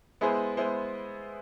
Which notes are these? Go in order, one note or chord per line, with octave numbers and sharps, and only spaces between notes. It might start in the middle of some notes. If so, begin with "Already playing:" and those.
G#3 B3 E4 G#4 C5
G#3 B3 E4 G#4 C5